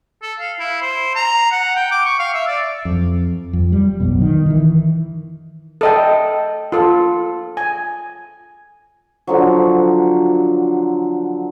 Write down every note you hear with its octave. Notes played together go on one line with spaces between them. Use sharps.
A4
F5
E4
C5
A#5
F#5
G5
D6
C#6
F5
E5
D5
F2
F2
G3
B1 F#2 B2
D#3
D#3 E3
A4 D#5 G5
F4 A4
G#5
D3 F3 F#3